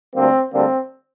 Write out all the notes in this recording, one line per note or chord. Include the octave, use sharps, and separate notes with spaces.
D2 D3 G3 A#3 C4
D2 D3 G3 A#3 C4